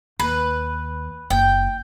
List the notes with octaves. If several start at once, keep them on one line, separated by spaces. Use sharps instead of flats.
D#2 B4
F#1 G5